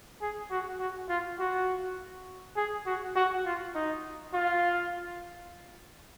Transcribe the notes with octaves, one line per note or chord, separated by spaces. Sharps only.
G#4
F#4
F#4
F4
F#4
G#4
F#4
F#4
F4
D#4
F4